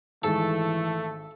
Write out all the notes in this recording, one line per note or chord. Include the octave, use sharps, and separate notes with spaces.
G#1 E3 G#3 A3 A4 C#6